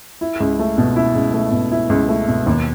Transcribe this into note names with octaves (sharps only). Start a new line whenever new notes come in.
E4
C#2
A3
B2
E4
C#2
A3
B2
E4
C#2
A3
B2
D#2